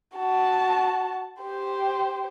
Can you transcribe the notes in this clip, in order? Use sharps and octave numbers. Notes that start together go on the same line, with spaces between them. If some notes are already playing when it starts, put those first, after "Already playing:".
F#4 A5
G4 C5